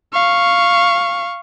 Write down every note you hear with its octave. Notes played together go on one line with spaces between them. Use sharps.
F5 C#6